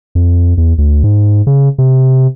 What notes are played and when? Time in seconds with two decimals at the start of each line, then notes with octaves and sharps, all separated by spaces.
0.15 F2
0.57 E2
0.78 D2
1.04 G#2
1.47 C#3
1.78 C3